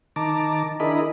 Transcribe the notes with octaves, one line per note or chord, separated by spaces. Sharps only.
D#3 A5 A#5 D6
D4 E4 G#4 A#4 D#5 B5